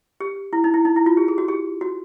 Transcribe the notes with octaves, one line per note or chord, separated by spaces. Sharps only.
G4
E4
D#4
E4
D#4
E4
F4
G4
G#4
F#4
G4
F#4